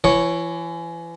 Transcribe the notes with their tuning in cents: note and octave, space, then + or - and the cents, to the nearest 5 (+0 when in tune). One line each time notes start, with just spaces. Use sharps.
E3 +35 C#5 +0